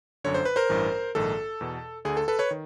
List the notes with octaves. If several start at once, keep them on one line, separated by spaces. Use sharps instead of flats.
G1 F#2 D3 C#5
C5
B4
A#4 C5
A1 G2 E3
A#1 G#2 D#3 A4
E2 B2
D2 D3 G#4
A4
A4 B4
B4 C#5
D#3